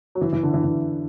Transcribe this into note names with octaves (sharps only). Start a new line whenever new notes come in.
F#3
E3
E3
D3
E3
E3